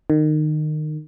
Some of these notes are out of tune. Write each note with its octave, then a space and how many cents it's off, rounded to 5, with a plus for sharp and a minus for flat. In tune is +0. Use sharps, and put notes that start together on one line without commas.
D#3 -25